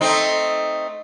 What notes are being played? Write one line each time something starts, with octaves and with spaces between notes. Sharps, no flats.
A3 C4 D#4